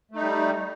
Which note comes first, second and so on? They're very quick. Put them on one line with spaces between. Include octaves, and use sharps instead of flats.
A3 D#4 G3